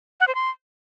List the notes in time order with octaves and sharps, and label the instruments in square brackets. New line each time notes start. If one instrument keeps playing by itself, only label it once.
[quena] F#5
C5
C6